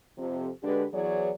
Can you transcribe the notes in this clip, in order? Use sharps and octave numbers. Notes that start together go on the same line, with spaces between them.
F2 C3
D3 G#3 D4 G4 B4
E2 E3 F#3 G#4 C#5 D5